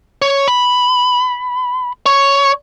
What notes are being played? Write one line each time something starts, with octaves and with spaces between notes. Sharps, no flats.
C#5
B5
C#5